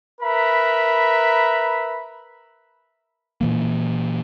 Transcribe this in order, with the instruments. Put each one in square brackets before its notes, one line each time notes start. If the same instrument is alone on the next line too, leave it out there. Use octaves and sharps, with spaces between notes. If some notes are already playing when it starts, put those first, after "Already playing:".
[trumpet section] A#4 B4 E5 A#5 B5
[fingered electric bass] A#2 E3 A#3